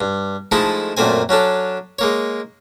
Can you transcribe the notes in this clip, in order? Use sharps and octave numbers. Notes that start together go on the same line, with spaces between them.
G2
F3 G#3 A3 D#4 E4 A4
F#2 A#2 A3 C4 G#5
F#3 C#4 D4 A4
G#3 A#3 C#5